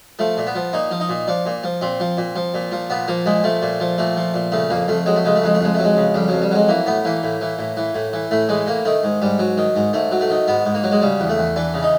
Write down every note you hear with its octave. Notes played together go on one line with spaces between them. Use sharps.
F3 A3
A#2
B3
F3
A#2 D#4
F3
D#4
A#2
F3 D4
A#2
F3
A#2 C4
F3
A#2
F3
A#2
F3
A#2 B3
F3 A#3
A#2 G#3
F3 A3
A#2
F3
A#2 A3
F3
A#2
C#3 A3
F2 A#3
F2 A3
F#3 G#3
A3
C#3 G#3
A3
F2 G#3
A3
F2 G#3
F#3 A3
G#3
C#3
F2 G3
F2 F#3
G3
F#3 G#3
E3 A#3
A2 B3
E3 A#3
A2
E3
A2
E3
A2
E3
A2 A3
E3 G#3
A2 A#3
D#3 A3
G#2
G#2 G3
F#3
D#3
G#2
G#2 A3
F#3
A3
D#3
G#2 B3
G#2
A#3
F#3
G#3
C#3 G3
E2
A3
E2
E3 D4
C#3
D#4